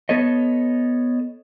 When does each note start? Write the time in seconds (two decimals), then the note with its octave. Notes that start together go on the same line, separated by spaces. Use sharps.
0.09 B3 A4 C#5 D#5